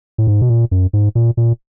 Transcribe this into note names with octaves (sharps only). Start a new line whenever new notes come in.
A2
G#2
B2
A#2
F#2
G#2
A#2
A#2